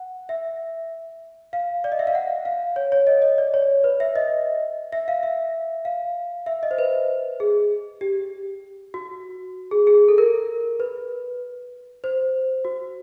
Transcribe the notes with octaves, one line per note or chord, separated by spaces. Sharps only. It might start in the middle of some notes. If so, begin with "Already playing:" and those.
Already playing: F#5
E5
F5
D5
D#5
E5
F5
F#5
F5
C#5
C#5
D#5
D#5
D5
C#5
B4
E5
D#5
E5
F5
E5
F5
E5
D#5
C5
B4
G#4
G4
F#4
G#4
G#4
A4
A#4
B4
C5
F#4